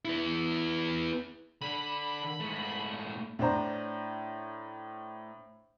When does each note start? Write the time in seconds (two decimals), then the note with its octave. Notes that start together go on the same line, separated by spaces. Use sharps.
0.05 B3 E4
1.61 D3 B5
2.40 G#2 A3
3.39 A2 D4 C5 A#5